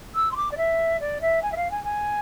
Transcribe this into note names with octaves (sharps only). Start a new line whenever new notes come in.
E6
C6
D6
D5
E5
D5
E5
G#5
E5
F5
G#5
G#5